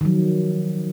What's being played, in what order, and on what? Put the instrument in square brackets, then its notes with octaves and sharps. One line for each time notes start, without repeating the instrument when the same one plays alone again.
[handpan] D#3 F3 F#3